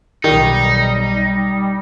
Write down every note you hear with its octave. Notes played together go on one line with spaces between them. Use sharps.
B1 D#3 G3 D#4